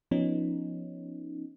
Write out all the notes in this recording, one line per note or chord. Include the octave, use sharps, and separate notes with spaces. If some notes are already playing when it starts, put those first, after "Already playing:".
F3 B3 C#4 D#4